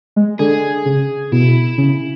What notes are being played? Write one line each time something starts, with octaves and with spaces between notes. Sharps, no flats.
G#3
D3 G#4
C#3
B2 E4
C#3